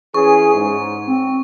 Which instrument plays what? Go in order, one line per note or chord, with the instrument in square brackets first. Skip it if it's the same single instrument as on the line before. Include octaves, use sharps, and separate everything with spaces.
[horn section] E3 C#4 G#4 [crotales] C#6
[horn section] G#2
[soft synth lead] C4